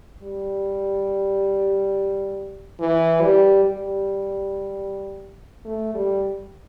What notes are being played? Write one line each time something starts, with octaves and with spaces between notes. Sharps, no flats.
G3
E3
G3
G3
A3
G3